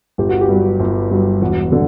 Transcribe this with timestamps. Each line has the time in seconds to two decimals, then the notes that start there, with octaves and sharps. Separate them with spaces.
0.18 G1 G4
0.29 F#4
0.41 G4
0.49 G2 F#3
0.80 G1
1.11 G2 F#3
1.41 E1 F#4
1.72 D3 F#3